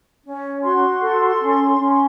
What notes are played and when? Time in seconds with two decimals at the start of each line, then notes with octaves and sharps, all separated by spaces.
0.24 C#4
0.62 F#4 C6
1.01 A4
1.40 C#4
1.79 C#4